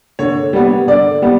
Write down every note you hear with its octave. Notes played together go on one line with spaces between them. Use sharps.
D3 C#5
G3 B3
D3 D5
G3 B3